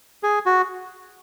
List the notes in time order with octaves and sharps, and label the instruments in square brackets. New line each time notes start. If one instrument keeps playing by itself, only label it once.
[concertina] G#4
F#4